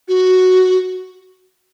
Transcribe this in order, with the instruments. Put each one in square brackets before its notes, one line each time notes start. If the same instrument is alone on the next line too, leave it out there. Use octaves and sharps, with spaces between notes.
[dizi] F#4